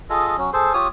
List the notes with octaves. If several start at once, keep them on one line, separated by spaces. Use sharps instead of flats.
F4 G#4 A4 D#5
F#3 C#4
G#4 A4 C5
F4 G4 C#5 D#6